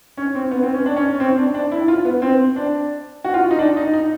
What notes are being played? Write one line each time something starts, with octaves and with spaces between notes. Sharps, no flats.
C#4
C4
B3
C4
C#4
D4
C#4
C#4
C4
D4
D4
E4
F4
B3
C4
D4
F#4
F4
D#4
D4
D#4
D#4